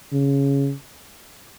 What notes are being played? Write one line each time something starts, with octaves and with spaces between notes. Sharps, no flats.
C#3